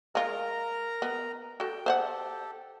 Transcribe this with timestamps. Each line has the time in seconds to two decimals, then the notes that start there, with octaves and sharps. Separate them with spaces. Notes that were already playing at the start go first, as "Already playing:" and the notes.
0.15 G#3 F4 A#4 A#5
1.02 B3
1.60 F#4 A4 G5
1.86 G4 A4 C5 F5 F#5